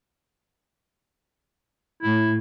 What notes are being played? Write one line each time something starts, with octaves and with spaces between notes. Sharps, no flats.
A2 E4